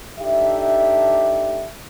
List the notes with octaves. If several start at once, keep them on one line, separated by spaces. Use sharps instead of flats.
D4 D#4 G4 A4 E5